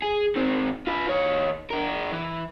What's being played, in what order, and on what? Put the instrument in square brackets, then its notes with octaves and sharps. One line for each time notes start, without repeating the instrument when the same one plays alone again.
[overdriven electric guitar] G#4
D#3 C4
F4 B4
D#3 C#5
D4 A#4
E3